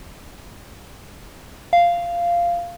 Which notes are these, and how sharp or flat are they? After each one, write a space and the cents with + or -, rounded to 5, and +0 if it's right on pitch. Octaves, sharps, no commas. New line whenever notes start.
F5 -10